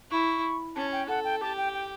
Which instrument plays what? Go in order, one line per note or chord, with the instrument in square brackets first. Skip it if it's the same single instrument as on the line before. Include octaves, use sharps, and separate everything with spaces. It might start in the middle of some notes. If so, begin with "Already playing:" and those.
[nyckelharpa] E4 [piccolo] C#6
[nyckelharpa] C#4 [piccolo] A5
[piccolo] G5
[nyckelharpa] A4 [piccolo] F#5
[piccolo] G5
[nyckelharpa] G4 [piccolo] A5
[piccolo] G5
G5